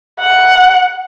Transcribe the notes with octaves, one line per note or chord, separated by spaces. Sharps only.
F#5